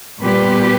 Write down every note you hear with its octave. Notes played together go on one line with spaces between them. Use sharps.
A#2 G3 B3 G4 B4